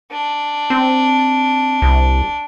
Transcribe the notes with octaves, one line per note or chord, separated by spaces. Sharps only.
D4
C4
C2